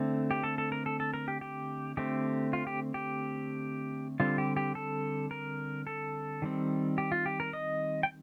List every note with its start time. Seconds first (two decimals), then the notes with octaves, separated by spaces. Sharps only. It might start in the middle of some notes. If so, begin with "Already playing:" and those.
Already playing: D3 A3 C4
0.31 G4
0.44 A4
0.58 A4
0.72 A#4
0.86 A4
1.00 A4
1.14 A#4
1.28 G4
1.41 G4
1.97 D3 A3 C4 G4
2.53 F4
2.67 G4
2.94 G4
4.20 D3 G3 C4 F4
4.38 G4
4.57 G4
4.75 A4
5.31 A#4
5.87 A4
6.42 D#3 G3 C4
6.98 G4
7.12 F4
7.26 G4
7.40 A#4
7.53 D#5
8.03 G5